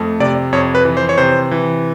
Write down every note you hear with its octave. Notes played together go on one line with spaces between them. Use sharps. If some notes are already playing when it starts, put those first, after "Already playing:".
Already playing: F2 A3
C3 D5
F2 C#5
B4
E3
C5
C#5
C3 C5
E3